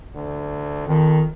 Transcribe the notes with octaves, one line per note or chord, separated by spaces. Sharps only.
D2
F2 D#3